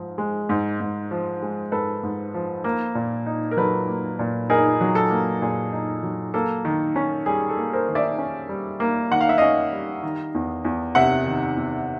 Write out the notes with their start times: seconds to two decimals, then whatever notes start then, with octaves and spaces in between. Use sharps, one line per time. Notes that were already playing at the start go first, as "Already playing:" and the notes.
Already playing: G#2 F3
0.18 G#3
0.49 G#2
0.80 G#2
1.11 F3
1.42 G#3
1.72 G#2 A4 B4
2.03 G#2
2.34 F3
2.64 A#3
2.95 A#2
3.26 D#4
3.51 A#4
3.57 F#3 A4 B4
3.88 A#3
4.19 A#2
4.50 D#4 G#4 A#4
4.81 F#3
4.95 A4
5.10 A#3
5.42 A#2 G#4
5.73 D#4
6.03 F#3
6.34 A#3 A4
6.65 D#3
6.96 C#4
7.26 G3 G#4
7.50 A4
7.57 A#3
7.73 A#4 C5
7.88 D#3
7.95 D5 E5
8.18 C#4
8.49 G3
8.80 A#3
9.11 D#3 F#5
9.21 F5
9.29 E5
9.38 C#4 D#5 F5
9.72 G3
10.03 D#3
10.35 E2
10.65 E2
10.95 C3 E5 F#5
11.27 D#3
11.57 E2